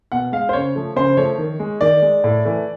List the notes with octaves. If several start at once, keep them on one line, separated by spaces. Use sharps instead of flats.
B2 F#5
G#3 F5
C5
C#3 C#5
F3 A3
C#3 C5
F3 A3 C#5
D#3
G#3
D#3 D5
G#3
A2
E3 A3